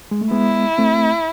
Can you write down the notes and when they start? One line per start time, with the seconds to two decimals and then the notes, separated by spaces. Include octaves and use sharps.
0.11 G#3
0.21 A3
0.31 G#3 B3 E4
0.78 A3 C4